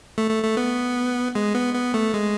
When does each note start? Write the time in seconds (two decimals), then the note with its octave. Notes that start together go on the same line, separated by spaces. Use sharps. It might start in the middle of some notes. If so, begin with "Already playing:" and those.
0.18 A3
0.31 A3
0.44 A3
0.57 B3
1.35 G#3
1.55 B3
1.75 B3
1.94 A3
2.14 G#3